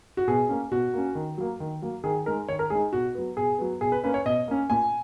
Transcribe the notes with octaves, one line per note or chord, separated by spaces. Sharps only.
F#4
B2 G#4
A#3 C#4
B2 F#4
A#3 C#4
D#3
F#3 A#3
D#3
F#3 A#3
D#3 G#4
G#3 D#4 A#4
D#3 C#5
A#4
G#3 D#4 G#4
B2 F#4
F#3 B3
B2 G#4
F#3 B3
B2 G#4
B4
A#3 C#4 B4
C#5
B2 D#5
A#3 C#4
A#2 G#5